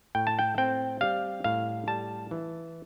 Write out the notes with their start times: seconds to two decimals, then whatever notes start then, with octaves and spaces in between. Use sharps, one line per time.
0.15 A2 G5
0.27 A5
0.39 G5
0.58 C4 G5
1.01 G3 F5
1.44 A2 F5
1.87 G3 A5
2.31 E3